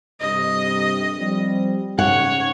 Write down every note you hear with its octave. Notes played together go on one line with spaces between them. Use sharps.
G2 C3 D#5
F3 G3 C4
G#2 C#3 C#5 F#5